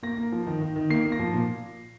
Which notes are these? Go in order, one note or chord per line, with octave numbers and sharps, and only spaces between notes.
A#3 A#6
A#3
F3
D#3
D#3
D#3
A#3 C7
A#3
A#6
F3
A#2